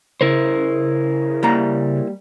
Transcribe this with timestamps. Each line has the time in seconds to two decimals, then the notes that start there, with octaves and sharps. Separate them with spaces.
0.21 C#3 E4 A#4 C5
1.43 G3 A#3 A#5